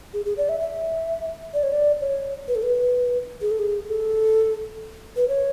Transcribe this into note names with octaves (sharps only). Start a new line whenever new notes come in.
G#4
G#4
D5
E5
E5
D5
C#5
D5
C#5
B4
A4
B4
G#4
A4
G#4
A4
B4
C#5